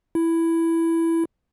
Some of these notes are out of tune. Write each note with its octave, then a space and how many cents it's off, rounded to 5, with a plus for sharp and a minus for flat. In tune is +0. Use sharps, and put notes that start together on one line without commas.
E4 +5